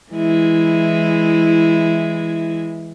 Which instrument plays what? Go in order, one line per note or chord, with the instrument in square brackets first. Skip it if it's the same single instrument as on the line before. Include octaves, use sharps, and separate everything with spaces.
[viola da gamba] E3 G#3 E4